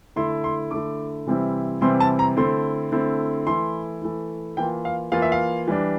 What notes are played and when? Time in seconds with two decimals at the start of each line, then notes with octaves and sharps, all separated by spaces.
0.16 D3 A3 E4 C6
0.44 C6
0.71 D3 A3 E4 D6
1.27 C3 E3 G3 C4 E4
1.81 C3 E3 G3 C4 E4 C6
2.00 A5
2.19 A#5
2.37 D3 A3 C4 E4 C6
2.92 D3 A3 C4 E4
3.46 E3 A3 E4 C6
4.02 E3 A3 E4
4.57 E3 A#3 F4 G5
4.85 F5
5.12 E3 A#3 F4 F5
5.22 E5
5.32 F5
5.68 E3 G3 D4